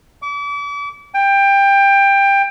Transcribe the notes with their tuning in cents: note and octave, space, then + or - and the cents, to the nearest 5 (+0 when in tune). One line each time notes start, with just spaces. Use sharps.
D6 -40
G5 +20